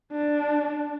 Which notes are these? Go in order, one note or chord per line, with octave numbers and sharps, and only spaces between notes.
D4